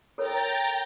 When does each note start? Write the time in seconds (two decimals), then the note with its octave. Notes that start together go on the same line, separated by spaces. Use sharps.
0.18 A4 A#4 C#5 G5 A#5 A6